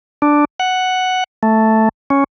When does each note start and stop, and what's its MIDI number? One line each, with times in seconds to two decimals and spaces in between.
0.22 0.45 62
0.60 1.24 78
1.43 1.89 57
2.10 2.24 61